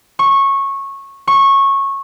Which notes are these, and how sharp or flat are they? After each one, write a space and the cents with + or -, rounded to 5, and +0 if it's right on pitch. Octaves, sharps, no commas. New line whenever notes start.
C#6 -15
C#6 -15